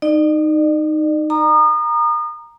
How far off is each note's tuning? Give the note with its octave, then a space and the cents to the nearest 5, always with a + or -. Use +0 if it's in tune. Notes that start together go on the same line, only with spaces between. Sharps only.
D#4 -10 D5 +40
A#5 +0 D#6 -35